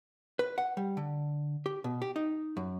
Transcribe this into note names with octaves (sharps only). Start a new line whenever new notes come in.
B4
F#5
G3
D3
G4
B2
G4
D#4
F#2